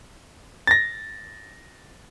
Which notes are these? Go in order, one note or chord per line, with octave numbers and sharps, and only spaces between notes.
A6 A#6